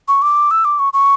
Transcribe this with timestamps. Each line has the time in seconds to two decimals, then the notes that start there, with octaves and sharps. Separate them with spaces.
0.08 C#6
0.22 D6
0.51 E6
0.65 D6
0.79 C#6
0.93 C#6